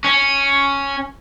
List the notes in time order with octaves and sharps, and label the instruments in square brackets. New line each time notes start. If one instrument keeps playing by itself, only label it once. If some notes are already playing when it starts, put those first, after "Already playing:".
[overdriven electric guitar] C#4